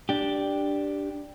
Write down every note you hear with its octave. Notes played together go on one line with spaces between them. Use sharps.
D4 G4